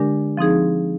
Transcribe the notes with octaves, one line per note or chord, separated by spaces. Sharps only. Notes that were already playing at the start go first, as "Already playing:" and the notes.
Already playing: D3 G#3 D4 G4 A#4
F3 C4 D#4 G#4